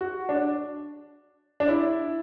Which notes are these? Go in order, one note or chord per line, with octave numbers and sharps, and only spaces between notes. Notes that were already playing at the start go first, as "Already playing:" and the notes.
F#4
D4
D4
E4